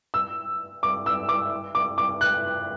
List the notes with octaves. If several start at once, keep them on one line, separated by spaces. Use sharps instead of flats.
E6
D6
E6
D6
D6
D6
F#6